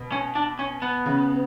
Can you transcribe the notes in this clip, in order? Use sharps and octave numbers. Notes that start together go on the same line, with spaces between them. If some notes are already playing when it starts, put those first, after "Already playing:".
Already playing: B2
C#4
D4
C#4
B3
C#3